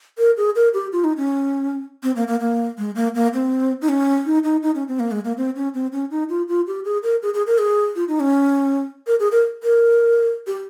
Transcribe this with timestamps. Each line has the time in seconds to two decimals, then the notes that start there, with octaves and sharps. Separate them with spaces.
0.18 A#4
0.37 G#4
0.56 A#4
0.74 G4
0.92 F4
1.04 D#4
1.17 C#4
2.03 C4
2.16 A#3
2.28 A#3
2.40 A#3
2.78 G#3
2.95 A#3
3.15 A#3
3.34 C4
3.82 D#4
3.89 C#4
4.26 D#4
4.44 D#4
4.63 D#4
4.75 C#4
4.88 C4
5.00 A#3
5.11 G#3
5.25 A#3
5.37 C4
5.56 C#4
5.74 C4
5.92 C#4
6.11 D#4
6.29 F4
6.48 F4
6.67 G4
6.85 G#4
7.03 A#4
7.22 G#4
7.34 G#4
7.47 A#4
7.58 G#4
7.96 F4
8.08 D#4
8.20 C#4
9.07 A#4
9.20 G#4
9.32 A#4
9.63 A#4
10.47 G4